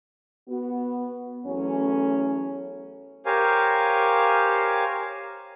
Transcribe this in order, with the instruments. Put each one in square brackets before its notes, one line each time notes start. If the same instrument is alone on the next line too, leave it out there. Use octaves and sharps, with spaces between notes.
[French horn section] B3 F#4
E2 F#3 A3 C#4
[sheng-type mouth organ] G4 A#4 C5 C#5 F5 G#5